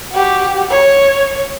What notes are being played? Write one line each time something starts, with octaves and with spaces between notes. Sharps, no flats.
F#4 G4
C#5